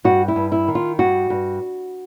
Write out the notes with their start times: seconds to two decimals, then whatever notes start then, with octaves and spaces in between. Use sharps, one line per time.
0.04 G2 F#4
0.28 E4
0.36 G2
0.52 E4
0.68 D#3
0.75 F4
0.99 G2 F#4
1.30 G2